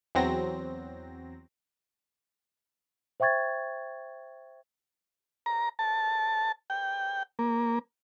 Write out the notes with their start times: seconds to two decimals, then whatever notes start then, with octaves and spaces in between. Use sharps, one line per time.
0.15 E2 F#3 C4 A#6
3.20 C5 E5 G5 C#6 G#6 A6
5.46 A#5
5.79 A5
6.70 G5
7.39 A#3